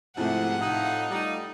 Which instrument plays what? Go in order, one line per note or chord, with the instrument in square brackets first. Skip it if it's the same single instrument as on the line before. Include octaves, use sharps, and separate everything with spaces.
[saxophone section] G#2 C3 [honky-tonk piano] F3 A3 [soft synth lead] E4 [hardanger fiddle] F#5
[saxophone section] A2 D#4 [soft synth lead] F5
[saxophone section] G3 D#4